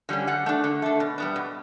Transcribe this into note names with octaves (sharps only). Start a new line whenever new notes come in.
D3 G3 C#4
D3 F#5
A3 D4
D3
A3 D4
B2
G3 B3 D4
B2